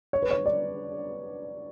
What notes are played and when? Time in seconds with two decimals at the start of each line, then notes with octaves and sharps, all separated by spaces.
0.13 C#5
0.22 B4
0.31 C#5
0.46 D5